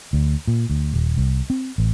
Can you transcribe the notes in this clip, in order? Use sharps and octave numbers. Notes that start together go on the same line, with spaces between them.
D2
A#2
D2
D#1
C2
C4
A1